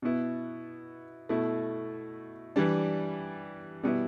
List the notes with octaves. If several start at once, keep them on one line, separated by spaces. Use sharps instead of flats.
B2 B3 E4
B2 A3 E4
E3 G3 D4
B2 G3 B3 E4